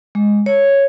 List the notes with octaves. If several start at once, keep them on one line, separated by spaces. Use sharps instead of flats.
G#3
C#5